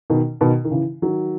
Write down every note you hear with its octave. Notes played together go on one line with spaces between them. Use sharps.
B2 D#3
B2 D#3
D#3
C#3 E3
D#3 F#3